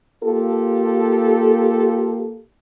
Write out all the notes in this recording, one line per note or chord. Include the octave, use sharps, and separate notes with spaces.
A#3 F4 G4 A4